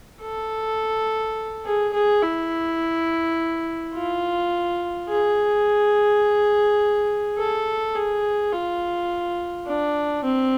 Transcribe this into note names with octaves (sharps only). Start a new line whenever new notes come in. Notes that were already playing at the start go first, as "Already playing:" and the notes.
A4
G#4
G#4
E4
F4
G#4
A4
G#4
F4
D4
C4